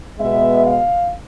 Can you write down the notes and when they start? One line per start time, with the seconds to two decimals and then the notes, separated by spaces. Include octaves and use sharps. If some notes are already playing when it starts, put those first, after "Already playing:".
0.19 B2 G#3 B3 E5
0.64 F5